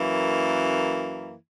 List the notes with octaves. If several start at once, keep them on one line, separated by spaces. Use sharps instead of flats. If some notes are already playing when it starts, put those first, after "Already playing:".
Already playing: F#2 E3 A#3